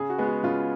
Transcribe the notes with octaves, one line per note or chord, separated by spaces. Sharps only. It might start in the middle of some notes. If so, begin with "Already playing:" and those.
Already playing: C#3 G#4
F#4
G#3 B3
F#4
C#3 F4